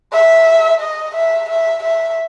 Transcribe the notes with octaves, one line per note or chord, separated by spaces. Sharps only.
E5
D#5
E5
E5
E5